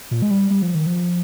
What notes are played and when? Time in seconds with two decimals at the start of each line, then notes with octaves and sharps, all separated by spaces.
0.11 A#2
0.22 G#3
0.30 G3
0.50 G3
0.62 F3
0.75 D#3
0.86 F3